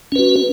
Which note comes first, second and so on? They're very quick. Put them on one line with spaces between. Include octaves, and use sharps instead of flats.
C#4 B4 F#4